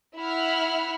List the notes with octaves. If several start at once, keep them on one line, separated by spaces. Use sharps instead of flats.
E4 E5 F#5 B5 F6